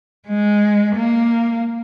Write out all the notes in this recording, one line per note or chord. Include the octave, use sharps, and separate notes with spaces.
G#3
A#3